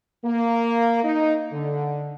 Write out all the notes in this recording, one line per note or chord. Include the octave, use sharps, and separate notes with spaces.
A#3
D#4
D3